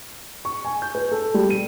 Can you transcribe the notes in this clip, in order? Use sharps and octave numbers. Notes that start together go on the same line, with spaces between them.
C#6
G#5
G6
B4
A4
G3
D#7